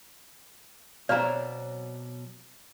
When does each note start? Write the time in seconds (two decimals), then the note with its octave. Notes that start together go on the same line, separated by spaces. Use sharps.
1.09 B2 F#3 C4 D4 C#5 D5 F5 A#5